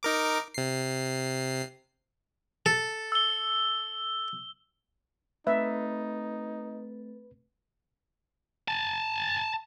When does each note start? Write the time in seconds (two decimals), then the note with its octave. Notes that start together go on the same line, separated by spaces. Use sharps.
0.03 D#4 A#4 D6
0.54 C3 C7
2.66 A4
3.12 E6 G7
5.47 A3 C4 D#4 B4 E5 A6
8.68 G#5 A5